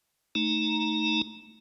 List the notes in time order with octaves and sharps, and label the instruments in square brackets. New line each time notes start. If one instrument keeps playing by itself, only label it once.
[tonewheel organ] A3 D#4 A#5